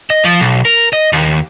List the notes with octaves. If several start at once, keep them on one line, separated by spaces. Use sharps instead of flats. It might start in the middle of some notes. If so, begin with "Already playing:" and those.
D#5
F3
B1
A#4
D#5
D#2